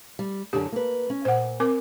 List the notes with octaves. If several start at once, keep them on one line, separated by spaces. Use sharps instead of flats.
G3
F#2 D3 D4 G4
A#3 B4
C#4
A#2 C5 F#5
C4 A#4 D6